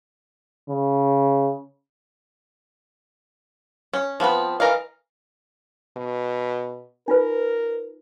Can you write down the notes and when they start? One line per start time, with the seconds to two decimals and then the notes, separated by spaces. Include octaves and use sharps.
0.70 C#3
3.93 C#4
4.20 F3 B3 C4 B4
4.60 E3 A#4 D#5 F5
5.97 B2
7.08 D#4 F4 A#4 B4